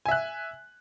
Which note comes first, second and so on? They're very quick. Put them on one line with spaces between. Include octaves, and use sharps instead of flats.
G#5 E5 F#6